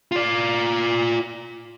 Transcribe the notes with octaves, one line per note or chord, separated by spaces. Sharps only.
F4 D5